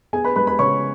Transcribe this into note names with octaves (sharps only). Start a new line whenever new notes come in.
B3 G#4 G#5
B4 B5
G#3 B4 B5
B4 B5
C#3 C#5 C#6